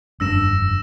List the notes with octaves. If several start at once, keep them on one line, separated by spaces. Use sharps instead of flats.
F1 G2 D4 E6 A#6 E7